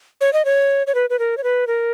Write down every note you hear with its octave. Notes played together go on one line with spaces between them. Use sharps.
C#5
D#5
C#5
C#5
B4
B4
A#4
C#5
B4
A#4